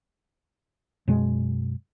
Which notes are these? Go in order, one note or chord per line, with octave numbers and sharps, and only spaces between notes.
F#2 B2 G#3